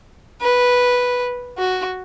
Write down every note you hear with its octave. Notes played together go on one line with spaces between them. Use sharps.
B4
F#4